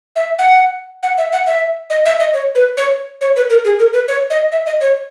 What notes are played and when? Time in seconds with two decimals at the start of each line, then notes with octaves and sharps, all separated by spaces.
0.16 E5
0.39 F#5
1.03 F#5
1.18 E5
1.33 F#5
1.47 E5
1.90 D#5
2.06 E5
2.20 D#5
2.33 C#5
2.55 B4
2.77 C#5
3.21 C#5
3.36 B4
3.50 A#4
3.65 G#4
3.79 A#4
3.93 B4
4.08 C#5
4.30 D#5
4.52 E5
4.66 D#5
4.81 C#5